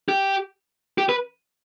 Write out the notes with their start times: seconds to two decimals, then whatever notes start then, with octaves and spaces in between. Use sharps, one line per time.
0.09 G4
0.98 G4
1.09 B4